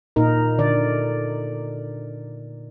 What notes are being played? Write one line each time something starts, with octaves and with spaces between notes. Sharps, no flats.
A#2 D#4 A#4
D3 D5